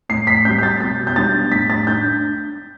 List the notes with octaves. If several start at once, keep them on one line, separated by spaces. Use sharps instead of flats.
A2 C7
B6
G3 C4 G6
G6
A6
B2 G6
G6
G3 B3 D4 A6
A2 B6
A6
D4 G6